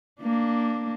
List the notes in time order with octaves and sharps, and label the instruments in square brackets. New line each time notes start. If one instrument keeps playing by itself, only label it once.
[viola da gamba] A#3 D4